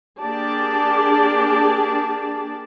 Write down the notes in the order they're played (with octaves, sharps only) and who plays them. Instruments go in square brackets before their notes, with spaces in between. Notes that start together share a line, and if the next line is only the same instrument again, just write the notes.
[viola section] A#3 D4 G4 G#4 D5 A5